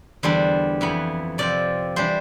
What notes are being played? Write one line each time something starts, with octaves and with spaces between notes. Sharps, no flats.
E2 D3 G3 D4 C5
F2 E3 B3
C3 F3 C4 D5
E3 G3 D4 C5